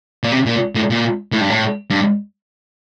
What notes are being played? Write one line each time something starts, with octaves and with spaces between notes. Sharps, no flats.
A#2
C3
A#2
A2
A#2
A2
G2
A2
G2